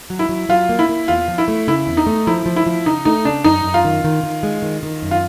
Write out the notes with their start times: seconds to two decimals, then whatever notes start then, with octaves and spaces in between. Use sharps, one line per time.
0.10 F#3
0.19 E4
0.29 F#3
0.49 F#3 F4
0.69 A#3
0.79 E4
0.89 A#3
1.08 E2 F4
1.28 F3
1.38 E4
1.48 A3
1.67 C#3 E4
1.87 E2
1.97 D#4
2.07 A3
2.27 F3 E4
2.46 F3
2.56 E4
2.66 F3
2.86 C#3 D#4
3.05 A3 D#4
3.25 C#3 D4
3.44 F#2 D#4
3.64 F#2
3.74 F4
3.85 D#3
4.04 D#3
4.24 D#3
4.43 G#3
4.62 D#3
4.83 D#3
5.02 F#2
5.11 F4